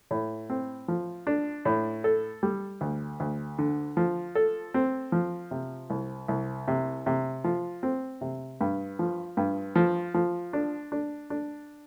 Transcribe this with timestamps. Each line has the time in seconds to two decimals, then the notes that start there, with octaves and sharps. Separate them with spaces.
0.11 A2
0.50 C4
0.88 F3
1.27 D4
1.65 A2
2.04 A4
2.43 G3
2.81 D2
3.20 D2
3.58 D3
3.97 F3
4.35 A4
4.74 C4
5.12 F3
5.51 C3
5.90 C2
6.28 C2
6.68 C3
7.06 C3
7.44 F3
7.83 C4
8.21 C3
8.61 G2
8.99 F3
9.37 G2
9.76 F3
10.14 F3
10.53 D4
10.92 D4
11.30 D4